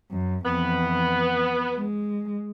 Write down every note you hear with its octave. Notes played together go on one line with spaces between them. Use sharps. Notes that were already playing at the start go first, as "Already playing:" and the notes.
F#2
F2 E3 B3
G#3